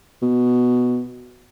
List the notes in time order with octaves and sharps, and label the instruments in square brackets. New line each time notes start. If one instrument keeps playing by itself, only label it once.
[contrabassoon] B2